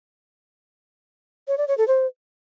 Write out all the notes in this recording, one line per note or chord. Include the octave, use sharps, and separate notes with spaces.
C#5
D5
C#5
A4
C5